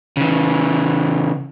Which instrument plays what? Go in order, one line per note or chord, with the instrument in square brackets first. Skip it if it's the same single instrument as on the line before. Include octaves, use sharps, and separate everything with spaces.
[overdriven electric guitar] C#3 E3